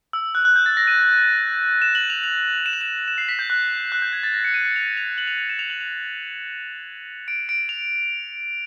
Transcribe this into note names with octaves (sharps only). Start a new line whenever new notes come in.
E6
F#6
F#6
G6
A6
A#6
D#7
E7
F#7
F7
F7
E7
F7
E7
E7
C7
B6
G6
F#6
F#6
G6
G#6
A6
A#6
C#7
D#7
C#7
F7
F7
F#7
F7
F7
E7
F7
F#7
F7
D7
D7
F7